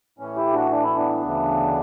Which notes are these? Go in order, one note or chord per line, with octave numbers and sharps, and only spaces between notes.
A2 E3 C#4
E4 G4
D4 F#4
D4
E4
B3 D4
D2 C#3 E3